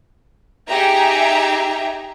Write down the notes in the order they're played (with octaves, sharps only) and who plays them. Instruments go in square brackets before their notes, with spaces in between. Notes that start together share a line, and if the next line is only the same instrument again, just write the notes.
[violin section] D#4 G4 G#4 E5 A#5